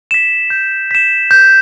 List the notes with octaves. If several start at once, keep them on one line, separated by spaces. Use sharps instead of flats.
B6 E7
G6
B6 E7
G6